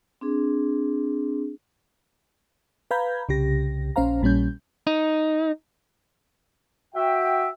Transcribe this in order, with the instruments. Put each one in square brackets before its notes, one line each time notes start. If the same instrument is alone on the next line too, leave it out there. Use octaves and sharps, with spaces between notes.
[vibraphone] C4 D4 G#4
[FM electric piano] B4 F5 A#5 B5 G6 G#6
C2 C#3 G4 A#6
A#1 C#4 C5 F5 A#5
A#1 A#2 G3 C#4 G6
[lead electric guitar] D#4
[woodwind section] F#4 E5 G5